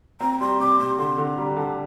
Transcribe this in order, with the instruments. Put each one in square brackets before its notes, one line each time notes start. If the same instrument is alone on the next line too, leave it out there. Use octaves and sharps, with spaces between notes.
[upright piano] C4 [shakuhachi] A#5
[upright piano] G3 [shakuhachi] C6
[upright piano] C3 [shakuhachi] D6
[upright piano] C3 [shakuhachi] C6
[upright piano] D3 [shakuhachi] C6
[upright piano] D3
[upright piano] G3 [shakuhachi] A#5
[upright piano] D3 [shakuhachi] A5